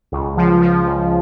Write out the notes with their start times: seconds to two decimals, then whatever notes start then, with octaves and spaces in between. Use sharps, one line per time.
0.12 C#2
0.37 F3
0.61 F3
0.87 C#2